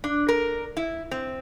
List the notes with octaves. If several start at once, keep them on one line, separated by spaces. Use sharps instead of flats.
D4
A#4
E4
C4